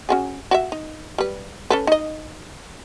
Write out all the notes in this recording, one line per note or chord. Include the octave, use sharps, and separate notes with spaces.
C#4 F#4 G#4
F#4 D5 E5
D#4
G3 B4
C#4 A4 B4
D#4 D#5